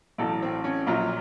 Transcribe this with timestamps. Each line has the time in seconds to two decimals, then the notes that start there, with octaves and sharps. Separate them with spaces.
0.18 A1 A2 F#3 A4
0.42 C4
0.64 C#4
0.87 A#1 A#2 F#3 F4